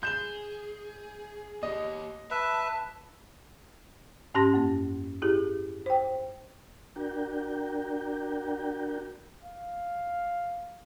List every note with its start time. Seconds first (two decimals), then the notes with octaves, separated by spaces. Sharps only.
0.03 G#4 G6 E7 G7
1.63 A#3 G4 D#5
2.31 B4 E5 A5
4.34 G#2 C#4 G4 A5 C6 A#6
4.54 F#2 A#3
5.22 E4 G4 G#4
5.86 C5 G5
6.96 D4 F#4 A#4 G5
9.44 F5